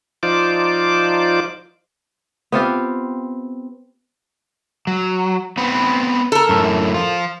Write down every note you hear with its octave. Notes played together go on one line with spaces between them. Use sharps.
F3 D#4 F4 C5 D5 D6
B3 C4 F4 G4
F#3
B3 C4 B4
A4 A#4
F#2 A2
F3 F4